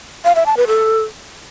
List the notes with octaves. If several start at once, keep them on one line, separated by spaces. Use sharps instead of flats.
F5
E5
A5
B4
A4